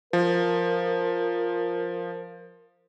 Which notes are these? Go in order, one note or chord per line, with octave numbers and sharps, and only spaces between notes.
F3 A#4